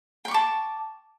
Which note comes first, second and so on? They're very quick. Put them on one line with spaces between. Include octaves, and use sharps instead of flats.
G5 C#6 D6 A5